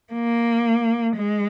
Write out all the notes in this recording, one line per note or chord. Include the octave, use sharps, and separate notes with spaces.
A#3
G#3